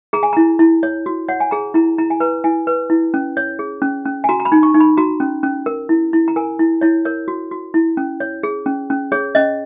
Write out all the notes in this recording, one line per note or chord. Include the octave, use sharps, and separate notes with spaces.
G#4 A#5
G#5
E4 A#5
E4
C#5
F#4
C#5 F#5
G#5
G#4 A#5
E4 A#5
E4 A#5
G#5
B4 A#5
E4 G#5
B4
E4
C#4
C#5
G#4
C#4
C#4
G#5
F#4 A#5
A#5
B5
D#4
C#6
D#4
B5
F#4 A#5
C#4
C#4
A#4
E4
E4
A#5
A#4 G#5
E4
E4 C#5
A#4 C#5
F#4
F#4
E4
C#4
C#5
G#4
C#4
C#4
G#4 C#5
C#4 D#5